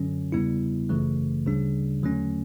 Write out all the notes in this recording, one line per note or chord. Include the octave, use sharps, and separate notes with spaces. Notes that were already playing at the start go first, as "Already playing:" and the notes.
Already playing: F#2 D3 F#3 C#4
E2 C#3 G3 B3 E4
G1 F#2 C#3 E3 A3
D2 C#3 G3 D4
E2 D3 F#3 A3 C#4